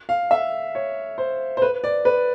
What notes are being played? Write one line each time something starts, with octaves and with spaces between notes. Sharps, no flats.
F5
E5
C#5
C5
C5
B4
D5
B4